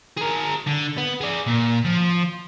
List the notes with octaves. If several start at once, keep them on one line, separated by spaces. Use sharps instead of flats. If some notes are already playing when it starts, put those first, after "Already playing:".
G#4 A#4
D3
B3
G#4 D5
A#2
F3